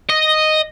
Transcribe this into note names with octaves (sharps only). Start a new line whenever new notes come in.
D#5